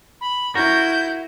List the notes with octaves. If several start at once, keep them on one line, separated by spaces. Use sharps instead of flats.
B5
E4 F#4 A#4 G6